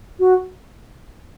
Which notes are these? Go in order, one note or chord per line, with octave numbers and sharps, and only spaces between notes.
F#4